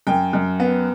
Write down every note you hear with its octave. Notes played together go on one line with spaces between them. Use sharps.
F#2 G5
F#2
B3